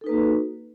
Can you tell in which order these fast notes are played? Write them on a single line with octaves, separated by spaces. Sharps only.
A4 D#4 B4 A#3 F#4